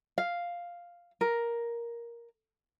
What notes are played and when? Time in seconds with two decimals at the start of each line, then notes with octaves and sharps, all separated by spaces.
0.18 F5
1.21 A#4